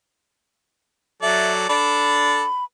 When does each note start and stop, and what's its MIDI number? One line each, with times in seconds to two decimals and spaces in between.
1.22 1.66 54
1.22 1.66 69
1.22 1.66 74
1.22 1.52 76
1.69 2.44 62
1.69 2.44 69
1.69 2.44 74
1.69 2.64 83